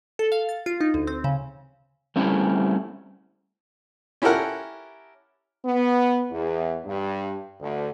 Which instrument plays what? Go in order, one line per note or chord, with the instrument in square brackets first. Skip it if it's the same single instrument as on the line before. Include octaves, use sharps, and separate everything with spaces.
[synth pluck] A4
F5
A6
F4
D#4
D2
C4
C#3
[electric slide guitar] G3 A3 C4 C#4 E4
[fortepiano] C#4 E4 G4 A4 A#4 F#5
[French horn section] B3
E2
G2
D2